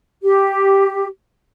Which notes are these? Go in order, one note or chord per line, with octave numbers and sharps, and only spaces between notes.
G4